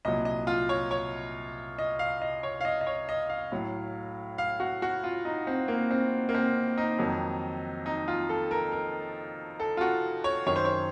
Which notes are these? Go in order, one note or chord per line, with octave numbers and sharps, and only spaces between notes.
C2 A#2 F#3 D#5
D#5
F4
C#5
C#5
D#5
F5
D#5
C#5
F5
D#5
D#5
C#5
D#5
F5
A2 F#3
F5
F#4
F#4
F4
D#4
C4
A#3
C4
A#3
C4
D#4
F2 D#3 F#3
D#4
F4
A4
A#4
A#4
A4
F4
F#4
C#5
F#2 D#3 F#3 C#5
C5
C#5